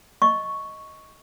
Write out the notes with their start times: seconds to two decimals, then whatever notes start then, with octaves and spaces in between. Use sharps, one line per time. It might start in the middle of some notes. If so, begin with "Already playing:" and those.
0.22 D#5 C#6